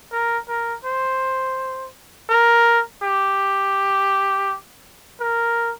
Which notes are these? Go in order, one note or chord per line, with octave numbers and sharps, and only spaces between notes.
A#4
A#4
C5
A#4
G4
A#4